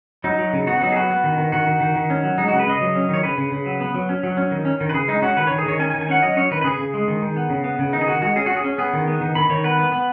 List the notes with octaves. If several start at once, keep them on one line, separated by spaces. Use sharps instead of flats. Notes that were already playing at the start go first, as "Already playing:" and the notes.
F#3 D#4
F#3
C#3
B3 F#4
F#3 D#4
G#4
B3 F#4
B3
D#3
D#3
D#3 F#4
D#3
D#3
D#3
C#4
F#3
G#3 D#4
C#3 F#4
B4
C#3 D#5
F#3
C#4
D#3 C#5
C#3 B4
C#3
C#3
F#3
B3
F#3
C#4
F#3
C#4
D#3
C#4
D#3
B4
C#3 G#4
G#3 D#4
C#4 F#4
D#3 B4
D#3 C#5
G#4
D#3 C#5
C#4 G#5
G#5
D#3
G#5
C#4 F#5
F#3 D#5
C#4 C#5
D#3 B4
B4
C#3 G#4
C#3
G#3
D#3
D#3
B3
C#3
B3
C#3
D#3 D#4
G#4
D#3 F#4
G#3 F#4
C#4 G#4
C#4 F#4
G#4
C#4
B3 G#4
D#3
B3
D#3
D#3 B5
D#3 C#5
B3 B4
B3
B3